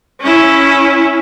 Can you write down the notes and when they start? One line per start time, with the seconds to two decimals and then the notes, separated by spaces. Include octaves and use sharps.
0.21 C#4 E4